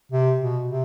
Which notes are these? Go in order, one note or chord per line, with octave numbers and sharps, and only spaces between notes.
C3
B2
C3